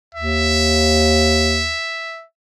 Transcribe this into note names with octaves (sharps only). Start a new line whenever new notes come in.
D#2 E5